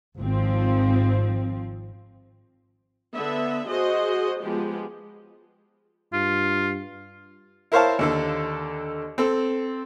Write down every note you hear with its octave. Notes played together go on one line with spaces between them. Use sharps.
G#1 F3 C4
D3 B3 E5
F#4 G#4 C5 D#5
F3 G#3 B3 G4
G2 F4
E4 A#4 C5 C#5 F5 A5
D#2 D3 A4
C4 A4